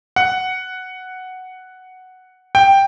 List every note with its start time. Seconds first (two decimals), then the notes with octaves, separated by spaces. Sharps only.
0.16 F#5
2.55 G5